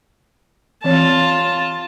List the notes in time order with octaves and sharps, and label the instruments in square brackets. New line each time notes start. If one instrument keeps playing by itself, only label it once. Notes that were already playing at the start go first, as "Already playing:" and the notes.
[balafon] E3 C4 C#5 [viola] F4 A5